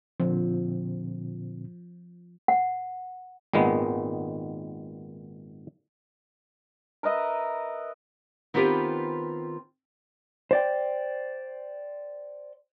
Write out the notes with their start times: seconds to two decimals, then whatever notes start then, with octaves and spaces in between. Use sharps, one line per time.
0.20 A#2 D3 F3 C4
2.48 F#5
3.53 G#1 A#2 D#3 G#3 B3
7.03 A#4 B4 D#5 E5
8.54 D#3 B3 C4 F4 G4 B4
10.51 C5 D5 G5